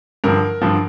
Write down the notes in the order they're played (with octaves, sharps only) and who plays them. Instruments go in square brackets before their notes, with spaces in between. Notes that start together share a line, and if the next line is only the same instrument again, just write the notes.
[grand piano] G2 D3 F3 A#4
G2 D3 F3